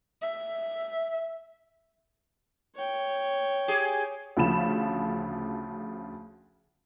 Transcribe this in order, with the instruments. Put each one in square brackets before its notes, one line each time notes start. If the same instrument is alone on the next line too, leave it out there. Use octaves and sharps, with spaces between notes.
[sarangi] E5
[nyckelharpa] C#5 G5
[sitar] G4 G#4
[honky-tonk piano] D2 C#3 F3 B5 E7